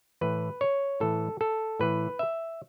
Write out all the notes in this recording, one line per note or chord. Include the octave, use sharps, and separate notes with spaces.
A2 E3 B4
C#5
A2 E3 A4
A4
A2 E3 B4
E5